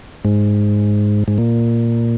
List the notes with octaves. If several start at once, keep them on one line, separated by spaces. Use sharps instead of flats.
G#2
G#2
A#2